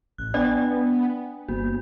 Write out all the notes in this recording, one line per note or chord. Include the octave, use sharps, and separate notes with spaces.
A1 F#6
B3 D4 D5 G5 G#5
G1 A#3 F#4